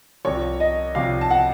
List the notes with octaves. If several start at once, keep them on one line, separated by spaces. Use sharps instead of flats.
C2 C3 F3 C#5
D#5
C2 C3 F3 F5
A5
F#5